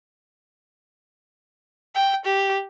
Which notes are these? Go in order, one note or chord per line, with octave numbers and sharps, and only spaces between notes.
G5
G4